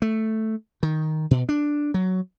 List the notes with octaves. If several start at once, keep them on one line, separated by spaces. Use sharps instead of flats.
A3
D#3
B2
D4
F#3